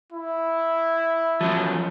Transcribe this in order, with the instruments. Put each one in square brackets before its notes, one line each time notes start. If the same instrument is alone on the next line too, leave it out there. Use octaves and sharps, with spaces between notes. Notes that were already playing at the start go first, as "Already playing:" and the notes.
[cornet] E4
[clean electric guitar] F3 F#3 C#4